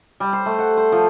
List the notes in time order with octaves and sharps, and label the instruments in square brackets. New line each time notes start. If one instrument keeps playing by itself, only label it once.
[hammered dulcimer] G3
C5
A3
F#5
C5
F3